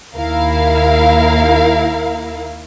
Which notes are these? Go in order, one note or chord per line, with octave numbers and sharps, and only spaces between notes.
D#2 E4 A#4 F5